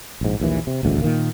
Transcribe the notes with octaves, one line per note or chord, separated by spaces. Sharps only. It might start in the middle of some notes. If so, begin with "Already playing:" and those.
A#1 G#2
A#1 D#2 E3
C3
D#1 A1 D2 G#2
A#2 D#3 A#3